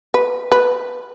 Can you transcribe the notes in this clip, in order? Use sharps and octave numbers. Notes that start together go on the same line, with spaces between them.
B4
B4